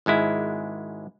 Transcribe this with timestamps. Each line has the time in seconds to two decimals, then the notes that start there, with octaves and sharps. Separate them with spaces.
0.06 G#1 G#2 G#3 E4